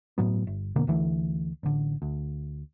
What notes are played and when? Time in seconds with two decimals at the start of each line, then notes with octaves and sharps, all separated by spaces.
0.18 G1 A2 F#3 B3
0.47 G1
0.76 F2 B2 D3 A#3
0.87 D2 D3 E3 A3
1.63 A1 D3
2.02 D2